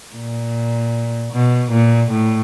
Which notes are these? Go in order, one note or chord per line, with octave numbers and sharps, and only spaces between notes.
A#2
B2
A#2
A2